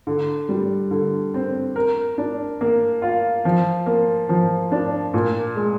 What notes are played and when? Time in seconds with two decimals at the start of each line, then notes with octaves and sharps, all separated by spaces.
0.07 D3
0.49 G3
0.91 D3
1.34 C4
1.76 A#4
2.18 D4
2.61 A#3
3.02 F4
3.45 F3
3.86 A#3
4.29 F3
4.72 D4
5.14 A#2
5.56 G#3